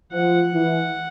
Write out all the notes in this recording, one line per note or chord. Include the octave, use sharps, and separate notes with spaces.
F3 F#5
E3